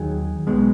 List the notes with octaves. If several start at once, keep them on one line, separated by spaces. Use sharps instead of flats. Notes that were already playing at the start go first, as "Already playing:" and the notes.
Already playing: D#2 D#3 F#3 G#4
B1 B2 G#3